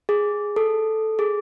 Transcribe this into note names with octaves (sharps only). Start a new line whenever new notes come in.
G#4
A4
G#4